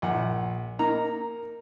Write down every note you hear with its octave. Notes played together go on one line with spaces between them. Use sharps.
A#1 F#5
A#3 D#4 A#5